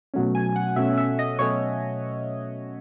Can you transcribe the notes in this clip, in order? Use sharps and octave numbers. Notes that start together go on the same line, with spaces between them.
B2 F#3 A3 C#4
G#5
F#5
B2 F#3 A3 C#4 E5
E5
D#5
B2 F#3 A3 C#4 C#5